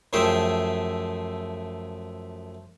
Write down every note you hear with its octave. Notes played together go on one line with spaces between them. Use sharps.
F#2 F3 A3 G#4 E5 G5